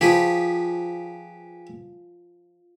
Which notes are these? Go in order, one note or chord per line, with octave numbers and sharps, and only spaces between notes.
F3 G4 G#4 B4